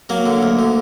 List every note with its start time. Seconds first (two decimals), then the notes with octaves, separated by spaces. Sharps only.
0.09 F#3 A#3
0.26 D3
0.43 D2
0.59 D3